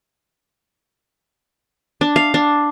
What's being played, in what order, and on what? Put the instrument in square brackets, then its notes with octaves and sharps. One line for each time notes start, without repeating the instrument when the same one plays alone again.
[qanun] D4
F5
D4